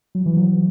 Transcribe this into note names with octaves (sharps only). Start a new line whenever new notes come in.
F#3
E3
F#3